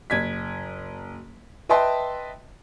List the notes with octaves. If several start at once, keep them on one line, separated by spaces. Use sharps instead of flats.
F#1 G#6 B6
B4 D#5 E5 G5 A5 C6